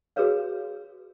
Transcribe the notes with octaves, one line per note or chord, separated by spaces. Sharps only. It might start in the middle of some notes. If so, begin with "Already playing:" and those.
F#4 G#4 A#4 B4 C#5 F5